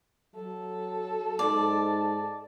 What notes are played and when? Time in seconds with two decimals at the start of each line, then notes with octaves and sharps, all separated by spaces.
0.35 F#3 A4
1.39 G#2 D5 A5